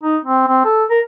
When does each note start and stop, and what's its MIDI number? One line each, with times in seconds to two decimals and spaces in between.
0.03 0.17 63
0.25 0.47 60
0.47 0.62 60
0.65 0.84 69
0.90 1.00 70